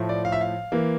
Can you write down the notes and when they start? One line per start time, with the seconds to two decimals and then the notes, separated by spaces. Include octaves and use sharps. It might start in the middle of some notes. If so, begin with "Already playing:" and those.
Already playing: A2 F3 A3
0.09 D5
0.25 F5
0.32 E5
0.41 F5
0.72 E3 A#3